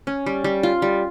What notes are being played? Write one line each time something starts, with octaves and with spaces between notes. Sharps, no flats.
C#4
G3
G3
F4
G3